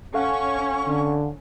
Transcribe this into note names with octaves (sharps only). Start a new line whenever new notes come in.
C#4 A4 F5 F#5 C#6
D3